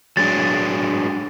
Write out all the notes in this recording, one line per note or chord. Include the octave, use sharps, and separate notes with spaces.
F#3 G#3 D4 A6